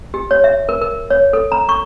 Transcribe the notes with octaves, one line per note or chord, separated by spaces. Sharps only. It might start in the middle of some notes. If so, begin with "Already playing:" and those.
G4
C#5
E5
A#4
A#4
C#5
A4
A#5
C#6